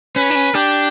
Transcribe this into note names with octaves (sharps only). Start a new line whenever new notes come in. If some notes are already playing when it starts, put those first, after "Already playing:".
C#4 B4
D4
C#4
D4 G4